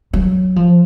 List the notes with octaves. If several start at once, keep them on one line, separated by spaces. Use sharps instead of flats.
F#3
F3